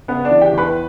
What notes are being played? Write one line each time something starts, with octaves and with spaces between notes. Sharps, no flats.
C#3 B3 B4
D4 D5
E3
G4 G5
E2
B4 B5